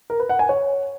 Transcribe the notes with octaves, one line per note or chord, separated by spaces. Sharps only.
A#4
B4
F#5
G#5
C#5